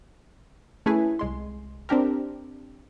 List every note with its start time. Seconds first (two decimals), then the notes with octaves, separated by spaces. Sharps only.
0.86 A3 C#4 E4 G#4 B4
1.19 C2 G#3 C6
1.89 C4 D4 G4 A#4